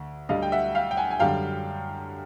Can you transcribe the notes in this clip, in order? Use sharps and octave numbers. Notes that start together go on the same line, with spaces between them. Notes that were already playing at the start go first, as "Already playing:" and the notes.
Already playing: D2
D2 D3 G3 D#5 F5
G5
E5 F#5
F5 G5
G5
F#5 G#5
G#5
F#2 D3 G3 F5 G5